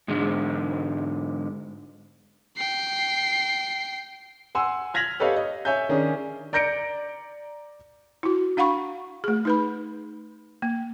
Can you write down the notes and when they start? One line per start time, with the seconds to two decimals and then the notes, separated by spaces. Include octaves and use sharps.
0.08 G#2 D3 G#3
2.57 G5 C7
4.55 F#5 G#5 C6 E6
4.94 F6 G#6 A#6 B6 F7 F#7
5.20 G4 A4 B4 C#5 D#5 F5
5.36 D#5
5.65 C#5 E5 G#5 G6
5.89 D#3 C#4 D4 G#4
6.53 D5 A#5 G6 A#6 C#7 D7
8.23 E4 F#4
8.57 D4 F5 F#5 A#5 B5 C#6
9.24 A3 G#4
9.45 D#4 B4 B5
10.62 A#3